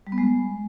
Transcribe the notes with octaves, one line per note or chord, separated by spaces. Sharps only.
G3
B3
G#3